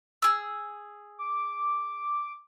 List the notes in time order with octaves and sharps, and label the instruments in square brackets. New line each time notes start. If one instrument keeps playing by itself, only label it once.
[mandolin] G#4 E6
[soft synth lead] D6